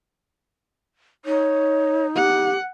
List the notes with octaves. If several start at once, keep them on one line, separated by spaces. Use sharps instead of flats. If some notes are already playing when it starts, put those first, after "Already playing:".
D#4 C#5
G4 F#5